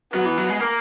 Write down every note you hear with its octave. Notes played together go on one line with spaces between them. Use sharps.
F#3 B3
E3
F#3
G#3
A#3